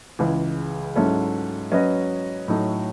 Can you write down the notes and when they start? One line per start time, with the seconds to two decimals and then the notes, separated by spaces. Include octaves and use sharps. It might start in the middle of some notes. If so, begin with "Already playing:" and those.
0.19 C#2 C#3 E3
0.96 G#2 F#3 C#4 E4 A4
1.72 F#3 C#4 F#4 B4 D#5
2.48 A2 F#3 A3 D#4